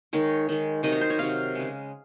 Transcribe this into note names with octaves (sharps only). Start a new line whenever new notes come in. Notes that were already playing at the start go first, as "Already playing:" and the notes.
D#3 G#3 C#5
D#3 G#3
C3 D#3 F#3 D#5
C#5
C5
C#5
C3 D#3 F#3 F5
C#3 G#3